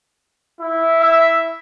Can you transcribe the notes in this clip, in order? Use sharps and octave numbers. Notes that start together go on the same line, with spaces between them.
E4
E5